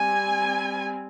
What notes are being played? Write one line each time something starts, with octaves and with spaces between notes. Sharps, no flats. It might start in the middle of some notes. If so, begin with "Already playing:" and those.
Already playing: G3 C4 G#5